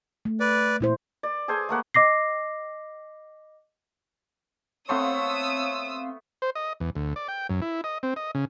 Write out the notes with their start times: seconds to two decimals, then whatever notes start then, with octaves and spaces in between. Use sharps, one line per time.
0.25 A3
0.40 B4 D5
0.81 A#2 E4 C5
1.23 D5
1.48 G#4 A4 C5 G#5
1.69 A3 A#3 F#5 B5
1.94 D#5 D6 A#6 C7
4.89 A3 B3 C4 C#5 F5 C6 D#6 E6
6.42 C5
6.56 D#5
6.80 E2
6.96 D2
7.16 D5
7.28 G5
7.50 F#2
7.62 E4
7.84 D#5
8.03 C4
8.16 D#5
8.35 C#3